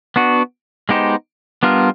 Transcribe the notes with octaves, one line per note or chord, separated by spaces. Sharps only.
B3 D4 F#4
G#3 B3 D#4 G4 C5
G3 B3 D4 F4 A#4